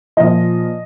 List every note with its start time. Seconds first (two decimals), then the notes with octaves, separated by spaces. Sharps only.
0.17 A#2 F3 D#5